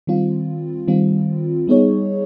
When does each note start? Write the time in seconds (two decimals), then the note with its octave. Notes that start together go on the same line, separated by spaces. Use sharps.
0.07 D#3 G3 C4 F4
0.87 D#3 G3 C4 F4
1.67 G3 B3 D#4 G#4 C#5